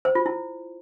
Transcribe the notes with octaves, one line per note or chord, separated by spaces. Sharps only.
C5
F4
E4